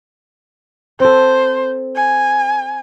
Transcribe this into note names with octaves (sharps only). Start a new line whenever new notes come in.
C4 A4 C5
G#5